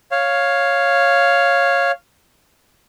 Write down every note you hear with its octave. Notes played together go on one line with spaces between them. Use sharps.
C#5 F5